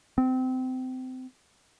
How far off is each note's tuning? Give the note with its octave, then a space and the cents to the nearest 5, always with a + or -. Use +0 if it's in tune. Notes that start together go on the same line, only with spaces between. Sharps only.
C4 -25